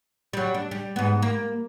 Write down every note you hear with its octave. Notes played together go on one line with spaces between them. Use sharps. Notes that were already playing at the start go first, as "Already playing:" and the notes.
F#3 G3
D4
G3
G#2 B3
A#3